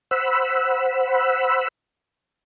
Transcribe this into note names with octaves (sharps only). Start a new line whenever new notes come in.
C5 F#5 B5 E6